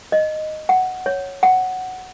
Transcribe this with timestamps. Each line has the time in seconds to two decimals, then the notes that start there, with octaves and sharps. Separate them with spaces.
0.12 D#5
0.69 F#5
1.06 C#5
1.43 F#5